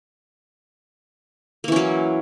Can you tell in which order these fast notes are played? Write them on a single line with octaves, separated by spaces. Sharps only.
A#3 E3 C#4 F#3